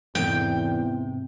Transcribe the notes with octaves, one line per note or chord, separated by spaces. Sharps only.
E2 G#2 C3 G5